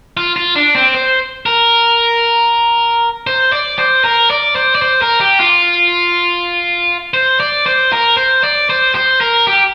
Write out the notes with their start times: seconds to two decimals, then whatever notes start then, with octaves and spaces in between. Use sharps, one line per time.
0.17 F4
0.36 F4
0.56 D4
0.75 C4
0.94 C5
1.46 A#4
3.27 C5
3.52 D5
3.79 C5
4.04 A#4
4.30 D5
4.55 C5
4.75 D5
4.82 C5
5.02 A#4
5.21 G4
5.40 F4
7.14 C5
7.40 D5
7.66 C5
7.92 A#4
8.17 C5
8.44 D5
8.70 C5
8.95 C5
9.21 A#4
9.47 G4